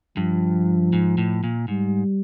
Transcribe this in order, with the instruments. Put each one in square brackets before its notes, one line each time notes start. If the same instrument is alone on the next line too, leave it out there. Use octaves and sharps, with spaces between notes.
[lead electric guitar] G2 [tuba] F3
[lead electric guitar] G#2
A2
A#2
[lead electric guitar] G#2 [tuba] G3